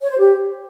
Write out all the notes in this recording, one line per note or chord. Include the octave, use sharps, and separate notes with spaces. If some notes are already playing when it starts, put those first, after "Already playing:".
C#5
C5
G4